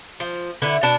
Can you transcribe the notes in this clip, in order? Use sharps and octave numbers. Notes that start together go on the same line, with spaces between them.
F3
D3 E4 B4
B2 D4 A5